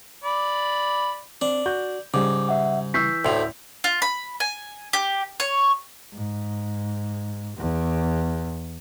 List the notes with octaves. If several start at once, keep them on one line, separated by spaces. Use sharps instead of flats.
D5 B5
C4 D4
F#4 G6
G#2 C#3 G3 D6
E5 F#5
E3 C#6 E6 G6 B6 C7
A1 D2 A2 E4 A4 G5 C6 F7
F4
B5
G#5
G4
C#5
G#2
E2